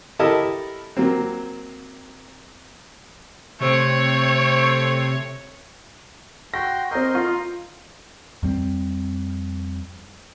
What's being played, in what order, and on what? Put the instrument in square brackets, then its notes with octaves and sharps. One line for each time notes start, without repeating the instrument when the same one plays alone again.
[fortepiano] E4 G4 A4 A#4 D#5 A5
F#3 A#3 C4
[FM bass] C3 [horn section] A3 C4 [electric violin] C#5
[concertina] F#4 G5 C6 [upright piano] A#6
[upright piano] C4 G6 [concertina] A#4 D#5 C6
[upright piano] F4
[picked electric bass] F2 G3 C4